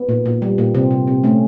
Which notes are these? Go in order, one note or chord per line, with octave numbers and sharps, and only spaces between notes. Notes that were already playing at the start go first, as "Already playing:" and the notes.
Already playing: B3
A#2
A#2
G3
A#2
C3 C4
C3
C3
A3 C#4